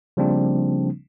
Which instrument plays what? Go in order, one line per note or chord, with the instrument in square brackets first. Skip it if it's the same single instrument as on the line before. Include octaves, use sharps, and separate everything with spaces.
[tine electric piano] C#3 F3 G3 A#3 C4 D4